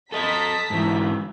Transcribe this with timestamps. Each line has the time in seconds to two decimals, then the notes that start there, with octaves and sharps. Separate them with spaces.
0.12 A4 D#5 A5 A#5 B6
0.70 G#2 E3